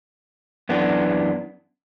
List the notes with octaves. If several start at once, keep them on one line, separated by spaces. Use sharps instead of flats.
F#2 E3 B3 D4